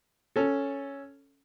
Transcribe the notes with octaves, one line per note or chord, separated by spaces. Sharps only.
C#4 A4